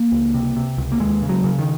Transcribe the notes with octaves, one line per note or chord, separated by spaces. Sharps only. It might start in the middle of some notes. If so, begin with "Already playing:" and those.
Already playing: A#3
C#2
C3
C3
C#2
A#3
D#2 G#3
C#3
F#3
C#3
D#3